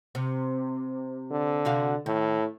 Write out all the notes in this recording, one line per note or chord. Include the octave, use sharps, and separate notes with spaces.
C3
D3
C3 F#4 F5
A2 D#3